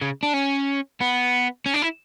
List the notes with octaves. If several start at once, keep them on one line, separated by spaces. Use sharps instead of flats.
C#3
D4
C#4
B3
C#4
D4
E4